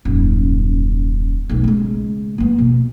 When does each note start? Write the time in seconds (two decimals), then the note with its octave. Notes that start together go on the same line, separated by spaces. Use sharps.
0.05 D#1 F#2
1.49 B1 A3
1.64 C#3 G#3
2.38 A#3 B3
2.58 B2